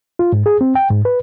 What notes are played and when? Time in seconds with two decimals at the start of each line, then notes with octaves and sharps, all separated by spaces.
0.19 F4
0.33 G#2
0.46 G#4
0.61 C4
0.75 G5
0.91 G#2
1.05 B4